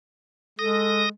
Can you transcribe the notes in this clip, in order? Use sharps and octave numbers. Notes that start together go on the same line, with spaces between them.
G#3 A4 D#6 A#6